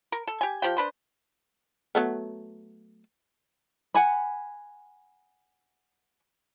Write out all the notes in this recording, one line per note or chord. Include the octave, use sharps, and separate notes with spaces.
A#4
A4
G4 G#5
F3 G4 G5
D4 B4 C5
F#3 A3 B3
F#5 G#5 B5